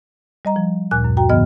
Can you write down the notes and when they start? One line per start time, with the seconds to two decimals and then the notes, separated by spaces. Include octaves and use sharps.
0.45 G3 D#5 A#5
0.56 F3
0.91 D2 A#2 G#5 F#6
1.04 F#2
1.17 F#4 G5 A#5
1.29 G#2 D3 F3 B3 D#5 F6